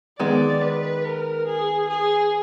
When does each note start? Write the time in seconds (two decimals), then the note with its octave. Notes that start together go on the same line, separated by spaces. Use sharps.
0.19 D#3 G#3 B3 D5
0.61 B4
1.04 A#4
1.47 G#4
1.89 G#4